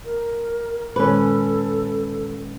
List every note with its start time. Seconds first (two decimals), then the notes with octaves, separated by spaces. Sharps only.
0.05 A#4
0.96 A#2 D#3 G#3 C#4 A4 B4